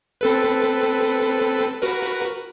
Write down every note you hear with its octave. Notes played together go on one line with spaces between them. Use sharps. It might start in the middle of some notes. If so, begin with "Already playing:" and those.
C4 A4 B4
F#4 A#4 B4